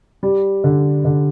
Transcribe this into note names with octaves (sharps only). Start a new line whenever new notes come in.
G3
D3
D3